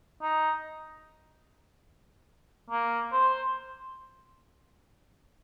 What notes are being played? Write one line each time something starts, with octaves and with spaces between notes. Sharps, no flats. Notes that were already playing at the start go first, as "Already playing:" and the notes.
D#4
A#3
C5